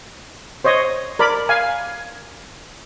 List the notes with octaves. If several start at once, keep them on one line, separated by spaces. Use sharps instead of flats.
C5 C#5 D#5
A#4 D5 B5
F5 G#5